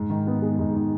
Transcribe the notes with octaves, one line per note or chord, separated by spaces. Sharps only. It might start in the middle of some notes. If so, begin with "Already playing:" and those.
Already playing: G#2
D#3
B3
G#3
G#2
D#3